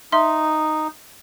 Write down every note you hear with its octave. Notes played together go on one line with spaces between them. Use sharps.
D#4 E5 C6